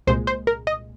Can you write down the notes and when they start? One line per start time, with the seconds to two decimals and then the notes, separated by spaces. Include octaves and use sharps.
0.07 C2 A#2 G#3 C5
0.27 C5
0.47 A#4
0.67 D#5